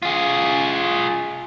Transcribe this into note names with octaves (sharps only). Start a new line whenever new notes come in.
F4 G#4